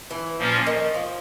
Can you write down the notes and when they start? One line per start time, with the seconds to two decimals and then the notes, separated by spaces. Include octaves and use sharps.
0.11 E3
0.38 A#2 F3 A#3 C#4 F4
0.66 D#3
0.94 F3